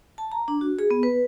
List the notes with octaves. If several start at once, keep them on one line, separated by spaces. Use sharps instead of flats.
A5
A#5
D4
F#4
G#4
B3
B4